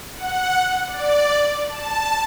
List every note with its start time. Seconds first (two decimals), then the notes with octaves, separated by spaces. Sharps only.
0.14 F#5
0.87 D5
1.68 A5